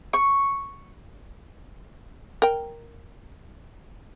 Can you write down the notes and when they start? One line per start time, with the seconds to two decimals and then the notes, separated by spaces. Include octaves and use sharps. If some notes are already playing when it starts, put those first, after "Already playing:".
0.13 C#6
2.42 A#4 G5